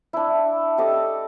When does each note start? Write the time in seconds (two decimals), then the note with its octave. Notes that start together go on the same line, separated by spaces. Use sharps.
0.13 D4 E4
0.78 G4 A4 D5 D#5